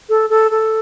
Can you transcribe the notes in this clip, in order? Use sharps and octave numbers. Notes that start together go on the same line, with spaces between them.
A4
A4
A4